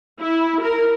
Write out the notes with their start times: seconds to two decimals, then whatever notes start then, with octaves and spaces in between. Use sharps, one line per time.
0.20 E4
0.62 A#4